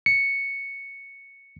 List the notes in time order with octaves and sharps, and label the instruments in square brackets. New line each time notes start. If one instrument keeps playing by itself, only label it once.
[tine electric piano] C#7